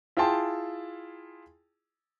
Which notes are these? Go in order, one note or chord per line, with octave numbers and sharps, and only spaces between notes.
E4 F4 G#4 G5 A5 C6